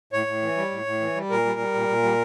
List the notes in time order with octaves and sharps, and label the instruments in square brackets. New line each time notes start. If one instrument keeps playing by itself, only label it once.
[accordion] A2 C#5
A2
E3
G3
A2
A2
E3
G3
A#2 A#4
G3
G3
A#2
A#2
G3